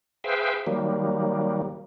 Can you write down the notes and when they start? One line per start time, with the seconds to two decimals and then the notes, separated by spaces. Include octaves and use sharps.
0.24 G#4 B4 C5 E5 F5 G5
0.67 D#3 F#3 G3 A#3